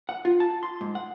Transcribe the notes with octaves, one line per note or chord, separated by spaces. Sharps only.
F#5
F4
A5
C6
G#2
F#5